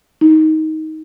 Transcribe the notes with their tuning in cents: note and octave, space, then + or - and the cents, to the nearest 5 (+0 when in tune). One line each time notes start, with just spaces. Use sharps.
D#4 +15